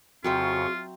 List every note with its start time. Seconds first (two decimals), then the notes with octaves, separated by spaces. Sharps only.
0.24 F2 C#3 F#3 C4 F4 F#4 E5 C#6